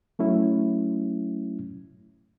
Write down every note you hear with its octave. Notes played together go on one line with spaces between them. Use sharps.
F#3 A3 C#4 E4